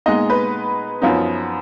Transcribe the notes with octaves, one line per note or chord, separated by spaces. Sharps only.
A#2 G#3 B3 D#4 D#5
B4
F#2 F3 B3 D#4